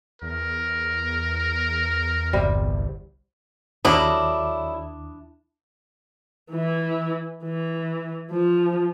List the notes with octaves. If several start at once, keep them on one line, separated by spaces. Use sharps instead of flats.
E2 A#4
G1 C2 C3 G3
D#2 D3 F#3 G3 D4 E4 D6 D#6
E3 E4
E3
F3